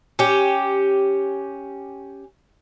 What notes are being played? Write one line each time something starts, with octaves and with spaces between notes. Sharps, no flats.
C#4 G4